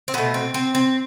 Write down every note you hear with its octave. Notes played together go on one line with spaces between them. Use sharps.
C4
B2 A3 B3
C4
C4
C4